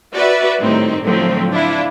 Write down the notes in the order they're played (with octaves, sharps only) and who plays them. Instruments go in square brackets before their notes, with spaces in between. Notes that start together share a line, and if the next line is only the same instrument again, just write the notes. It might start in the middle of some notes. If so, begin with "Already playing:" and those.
[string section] F#4 B4 D5 E5
A2 D#3 G3 C4 D#4
A2 D3 F3 F#3 A3 C4
D4 E4 F4